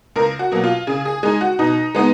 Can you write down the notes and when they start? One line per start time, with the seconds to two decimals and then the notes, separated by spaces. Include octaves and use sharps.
0.16 C#2 A#4
0.39 F#4
0.52 B2 F#3 A#3
0.64 F4
0.87 C#3 G#4
1.05 G#4
1.23 G#3 D#4 G#4
1.41 F#4
1.59 B2 D#4
1.95 G#3 B3 D#4